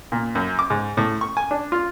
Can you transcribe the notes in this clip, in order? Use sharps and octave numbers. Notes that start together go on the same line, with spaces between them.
A#2
F#2
D6
G#2
A2
C#6
G#5
D4
F4